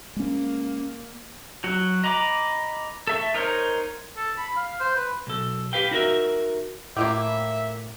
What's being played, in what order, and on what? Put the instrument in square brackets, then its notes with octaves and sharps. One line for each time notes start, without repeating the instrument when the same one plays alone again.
[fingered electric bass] G#3 C#4 [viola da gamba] A#3
[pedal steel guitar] F#3 F#4
D#5 A#5 B5 D6
A4 E5 C#6
D#4 A#4 C5 C#5
[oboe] A4
B5
F5
C5
B4
[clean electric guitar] B1 A4
G4 B4 F5 G5
D#4 F#4 A#4 E5
[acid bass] A2 [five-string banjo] A#3 F4 G5 [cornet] E5 [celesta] D6